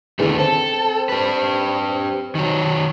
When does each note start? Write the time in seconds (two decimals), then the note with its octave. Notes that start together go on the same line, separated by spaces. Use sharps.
0.19 E2 D3 D#3 A3
0.39 C4 A4
1.09 G4 B4
2.35 D#3 F#3